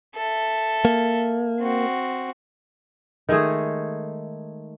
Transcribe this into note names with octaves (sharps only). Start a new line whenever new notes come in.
A4 E5
A#3
C4 F#4
D#3 G#3 A3 G#4